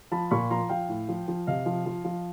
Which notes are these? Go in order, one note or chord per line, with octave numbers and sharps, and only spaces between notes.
F3 A5 B5
A#2 B5 C#6
F3 A#5 C6
F3 F5 G5
A2
F3
F3
C3 D#5 F5
F3
F3
F3